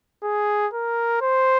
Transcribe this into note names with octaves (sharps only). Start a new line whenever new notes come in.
G#4
A#4
C5